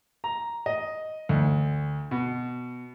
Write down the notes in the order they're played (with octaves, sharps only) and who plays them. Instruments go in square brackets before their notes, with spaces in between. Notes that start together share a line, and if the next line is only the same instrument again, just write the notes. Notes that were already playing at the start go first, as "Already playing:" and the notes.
[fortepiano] A#5
D#5
D2
B2